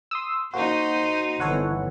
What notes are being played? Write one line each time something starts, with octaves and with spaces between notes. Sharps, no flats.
C6 D#6 E6
A#3 D#4 F#4 C5
G1 E3 B3 A4 C#5 F#5